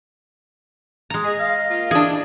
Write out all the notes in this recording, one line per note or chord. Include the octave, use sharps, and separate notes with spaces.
G#3 A#5
G#4 D#5
F5
A#3 F4
E3 D4 G#4